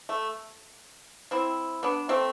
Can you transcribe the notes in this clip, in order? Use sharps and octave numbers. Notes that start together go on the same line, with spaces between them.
A3
C4 E4
B3 D4
A3 C4